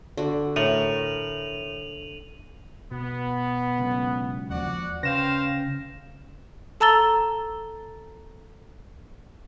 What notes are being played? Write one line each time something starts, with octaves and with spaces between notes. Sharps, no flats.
D3 F#4
A2 A#4 D#7 F7 F#7
B2 B3
C#2 F#2
D#2 F3 F#4 D5 F#5
C#3 B4 C5 F5 G5 A#6 E7
A4 A5 A#5 E6 A6 G7